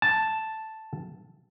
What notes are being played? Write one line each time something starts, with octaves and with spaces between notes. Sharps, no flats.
A5